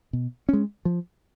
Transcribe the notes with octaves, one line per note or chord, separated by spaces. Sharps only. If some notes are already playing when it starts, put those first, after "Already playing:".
B2
G#3 C#4
F3